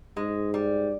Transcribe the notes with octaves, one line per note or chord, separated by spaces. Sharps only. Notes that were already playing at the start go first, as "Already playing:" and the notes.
G#2 G#3
G3